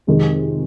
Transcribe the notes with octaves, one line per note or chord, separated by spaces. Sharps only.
F2 C3 D#3 G#3